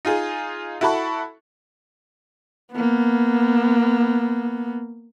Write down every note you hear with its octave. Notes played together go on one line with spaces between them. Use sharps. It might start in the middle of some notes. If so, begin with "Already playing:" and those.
D#4 F4 G#4
E4 F#4 A4 A5 B5 C#6
A#3 B3